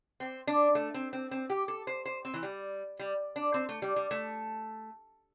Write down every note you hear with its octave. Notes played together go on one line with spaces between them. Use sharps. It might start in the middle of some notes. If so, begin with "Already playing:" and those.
C4
D4
A3
C4
C4
C4
G4
A4
C5
C5
C4
E3
G3
G3
D4
C4
A3
G3
G3
A3